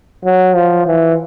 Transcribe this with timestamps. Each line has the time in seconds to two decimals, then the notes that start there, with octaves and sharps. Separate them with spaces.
0.25 F#3
0.55 F3
0.87 E3